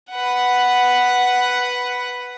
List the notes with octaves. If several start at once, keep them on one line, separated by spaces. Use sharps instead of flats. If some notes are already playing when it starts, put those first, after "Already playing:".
B4 F#5